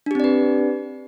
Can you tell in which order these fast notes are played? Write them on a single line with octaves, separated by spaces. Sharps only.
D4 G4 C4 D5 B4